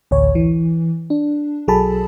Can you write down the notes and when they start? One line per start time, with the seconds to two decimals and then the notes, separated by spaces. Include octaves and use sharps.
0.11 A1 D2 C#5
0.35 E3
1.10 D4
1.68 B1 F#3 G#4 A4 A5 B5